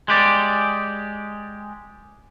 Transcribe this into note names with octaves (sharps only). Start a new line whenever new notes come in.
G#3 G4 D5